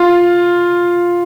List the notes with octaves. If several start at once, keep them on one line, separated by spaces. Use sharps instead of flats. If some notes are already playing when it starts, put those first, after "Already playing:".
Already playing: F4